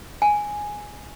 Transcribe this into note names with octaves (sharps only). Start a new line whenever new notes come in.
G#5